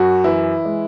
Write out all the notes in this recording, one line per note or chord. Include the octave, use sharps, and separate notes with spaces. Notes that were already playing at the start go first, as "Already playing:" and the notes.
Already playing: F#2 F#4
E3 E4
G#3